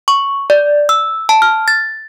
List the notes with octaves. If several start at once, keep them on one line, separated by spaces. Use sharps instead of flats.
C#6
D5
E6
A5
F6
A6